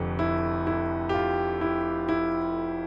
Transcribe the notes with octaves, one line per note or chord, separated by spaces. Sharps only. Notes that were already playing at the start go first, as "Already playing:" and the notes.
Already playing: F1 F2 D3
E4
E4
G4
F4
E4
E4